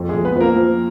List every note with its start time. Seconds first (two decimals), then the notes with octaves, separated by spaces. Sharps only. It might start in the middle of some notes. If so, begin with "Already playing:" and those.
Already playing: F2
0.09 G#3 G#4
0.14 F2
0.25 B3 B4
0.35 F3
0.41 A#3 A#4
0.56 F3